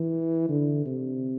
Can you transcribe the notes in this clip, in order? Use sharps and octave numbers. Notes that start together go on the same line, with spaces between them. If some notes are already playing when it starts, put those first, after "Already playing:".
Already playing: E3
D3
C3